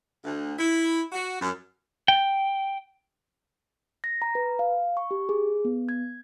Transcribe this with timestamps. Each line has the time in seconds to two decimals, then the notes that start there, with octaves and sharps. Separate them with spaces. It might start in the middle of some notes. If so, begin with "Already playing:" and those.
0.25 D2
0.58 E4
1.12 F#4
1.41 F#2
2.08 G5
4.04 A#6
4.22 A#5
4.35 B4
4.59 F5
4.97 C#6
5.11 G4
5.29 G#4
5.65 B3
5.89 G#6